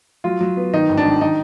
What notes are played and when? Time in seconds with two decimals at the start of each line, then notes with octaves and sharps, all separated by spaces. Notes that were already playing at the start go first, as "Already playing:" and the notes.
0.24 F#3 F4
0.41 F#3
0.57 B3
0.74 D#3 D#4
0.89 G#1
0.97 D4
1.05 D#3
1.21 D#4